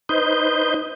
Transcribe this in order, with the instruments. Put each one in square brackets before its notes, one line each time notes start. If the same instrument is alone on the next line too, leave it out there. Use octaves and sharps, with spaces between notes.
[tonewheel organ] D#4 B4 C5 D#5 G6